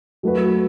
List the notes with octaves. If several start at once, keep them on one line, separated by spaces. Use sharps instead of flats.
F#3 A3 F#4 B4